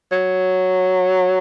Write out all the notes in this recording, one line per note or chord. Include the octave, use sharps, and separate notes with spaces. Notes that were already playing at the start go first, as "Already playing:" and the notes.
F#3